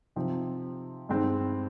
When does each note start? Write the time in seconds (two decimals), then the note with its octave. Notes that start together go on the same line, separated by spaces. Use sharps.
0.16 C3 F3 C4 D#4
1.09 G2 D#3 G#3 C4